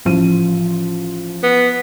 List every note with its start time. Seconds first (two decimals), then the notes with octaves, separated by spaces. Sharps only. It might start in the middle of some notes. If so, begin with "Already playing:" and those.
0.05 A1 F3 D#7
1.43 B3